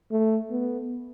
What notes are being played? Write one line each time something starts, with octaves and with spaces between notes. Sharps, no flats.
A3
B3